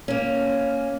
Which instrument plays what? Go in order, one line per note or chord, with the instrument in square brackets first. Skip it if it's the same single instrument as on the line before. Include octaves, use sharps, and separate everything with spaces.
[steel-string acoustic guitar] A#3 C#4